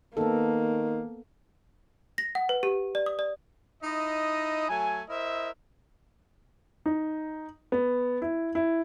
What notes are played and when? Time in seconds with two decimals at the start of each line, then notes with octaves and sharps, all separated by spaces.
0.17 D#3 A#3 B3 A4
2.18 A#6
2.35 F#5
2.49 B4
2.63 G4
2.95 D5
3.06 D#6
3.19 D5
3.83 D#4 E4 D#5
4.68 F#3 A3 G#5
5.08 E4 A#4 C5 D#5 E5
6.86 D#4
7.72 B3
8.22 E4
8.55 E4